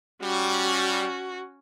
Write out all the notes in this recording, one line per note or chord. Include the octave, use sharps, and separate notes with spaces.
G3 C#4 F#4